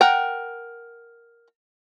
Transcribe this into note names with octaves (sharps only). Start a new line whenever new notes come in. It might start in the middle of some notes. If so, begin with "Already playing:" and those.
A#4 F#5 G5